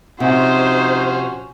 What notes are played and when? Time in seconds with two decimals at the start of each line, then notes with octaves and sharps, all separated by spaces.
0.20 C3 F3 C#4 D#4 F#4 C5